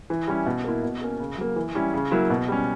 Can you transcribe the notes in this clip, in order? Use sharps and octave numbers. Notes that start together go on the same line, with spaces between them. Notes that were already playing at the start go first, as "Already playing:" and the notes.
E3
G3 C#4 E4
B2
A#3 E4
B2
A#3 C#4
C#3
F#3 A#3
E3
G3 C#4 E4
C#3
F#3 A#3 E4
B2
G3 C#4